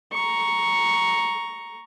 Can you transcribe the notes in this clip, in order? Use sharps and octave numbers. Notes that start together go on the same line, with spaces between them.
A#5 C#6